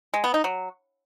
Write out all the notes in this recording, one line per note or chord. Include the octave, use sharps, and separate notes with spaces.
G#3
B3
D#4
F#3